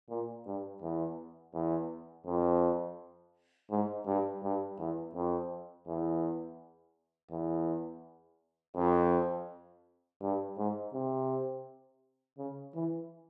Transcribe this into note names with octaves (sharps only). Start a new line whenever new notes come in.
A#2
G2
E2
E2
F2
G#2
G2
G2
E2
F2
E2
E2
F2
G2
G#2
C3
C#3
E3